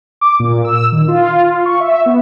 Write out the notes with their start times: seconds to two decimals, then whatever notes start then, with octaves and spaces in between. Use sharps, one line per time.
0.21 D6
0.40 A#2
0.64 E6
0.92 D#3
1.08 F4
1.66 C#6
1.80 E5
2.06 B3